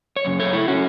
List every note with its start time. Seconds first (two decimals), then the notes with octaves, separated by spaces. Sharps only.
0.16 C#5
0.25 F#2 C#3
0.40 A4 C#5
0.53 E4 A4
0.68 C#4 F#4